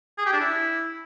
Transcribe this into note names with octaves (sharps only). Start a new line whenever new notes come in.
G#4
G4
D4
E4